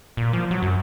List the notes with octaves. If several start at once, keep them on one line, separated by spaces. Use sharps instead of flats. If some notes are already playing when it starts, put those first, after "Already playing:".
A#2
F3
F#3
F#2